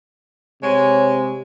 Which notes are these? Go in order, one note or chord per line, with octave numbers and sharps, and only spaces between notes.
C3 G#3 C#5